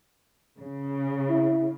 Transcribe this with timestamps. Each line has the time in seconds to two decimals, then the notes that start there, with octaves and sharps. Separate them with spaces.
0.58 C#3
1.29 E4